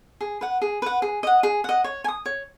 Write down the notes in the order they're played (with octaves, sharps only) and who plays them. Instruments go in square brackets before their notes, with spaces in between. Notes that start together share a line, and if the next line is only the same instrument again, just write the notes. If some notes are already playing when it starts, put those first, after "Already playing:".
[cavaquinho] G#4
B4 F#5
G#4
B4 F#5
G#4
D#5 F#5
G#4
D#5 F#5
C#5
G#5
D#6
C#5